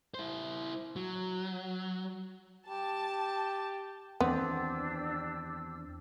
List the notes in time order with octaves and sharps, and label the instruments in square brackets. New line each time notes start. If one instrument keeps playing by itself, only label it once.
[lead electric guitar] E4 C5
F#3
[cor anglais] G4 [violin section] A5
[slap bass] E2 D#3 [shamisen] B3 [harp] C4 [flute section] D4 G4 E6